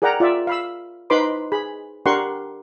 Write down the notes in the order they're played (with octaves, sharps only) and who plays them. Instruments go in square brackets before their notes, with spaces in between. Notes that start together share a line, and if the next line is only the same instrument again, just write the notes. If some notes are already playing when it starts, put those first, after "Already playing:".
[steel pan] G#4 A#4 D5 F#5 G5 A#5
F4 D5 E5
F5 B5 E6
D#4 B4 C5 B5 C6 D6
G#4 B5
D4 G4 A#4 F#5 C6 C#6